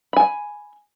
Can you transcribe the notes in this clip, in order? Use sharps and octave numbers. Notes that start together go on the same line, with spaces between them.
G#5 B5